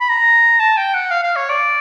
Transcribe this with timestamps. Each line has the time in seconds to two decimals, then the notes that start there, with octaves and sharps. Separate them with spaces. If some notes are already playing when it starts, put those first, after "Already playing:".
0.01 B5
0.09 A#5
0.60 A5
0.77 G5
0.94 F#5
1.11 F5
1.23 F5
1.36 C#5
1.49 D5